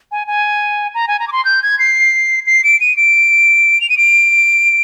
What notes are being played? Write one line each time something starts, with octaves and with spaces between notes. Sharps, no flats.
G#5
G#5
A#5
G#5
A#5
D6
C6
G6
G#6
C7
C7
D7
D#7
D7
F7
D#7
D7